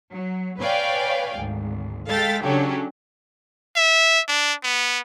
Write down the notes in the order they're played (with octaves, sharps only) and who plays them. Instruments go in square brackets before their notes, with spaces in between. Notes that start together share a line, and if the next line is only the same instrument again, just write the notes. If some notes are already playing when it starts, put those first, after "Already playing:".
[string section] F#3
B4 C#5 D5 F5 G5 G#5
G#1 D2
G#3 A4 F5 G5 A6 B6
C#3 F#3 C#4 D4 G4 A4
[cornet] E5
D4
B3